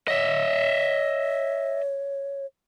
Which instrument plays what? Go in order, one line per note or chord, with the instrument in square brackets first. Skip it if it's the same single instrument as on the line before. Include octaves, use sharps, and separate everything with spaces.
[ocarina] C#5 [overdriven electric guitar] D#5 E5